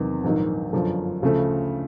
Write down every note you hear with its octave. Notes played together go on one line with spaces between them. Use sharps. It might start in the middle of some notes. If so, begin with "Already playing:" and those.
Already playing: E2 C3 D#3 F#3
A#1 G#2 D#3 F#3
G1 F#2 D3 F3
D2 C#3 F3 A3